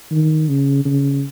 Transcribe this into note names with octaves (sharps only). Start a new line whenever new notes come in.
D#3
C#3
C#3